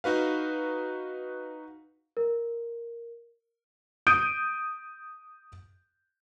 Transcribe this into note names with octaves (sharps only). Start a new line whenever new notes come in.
D#4 F#4 B4 F5
A#4
D#6 G6 D7 D#7